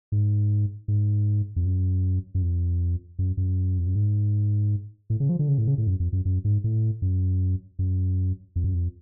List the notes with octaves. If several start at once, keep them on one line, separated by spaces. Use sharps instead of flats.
G#2
G#2
F2
F#2
F#2
F2
F#2
F#2
F2
F#2
G#2
A2
C#3
F3
D3
C#3
A2
C#3
A2
F#2
F2
F#2
F#2
G#2
A2
F#2
F#2
F2
F#2
F2